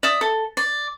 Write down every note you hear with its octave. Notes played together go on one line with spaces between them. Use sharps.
D5 E5 D#6
A4
D5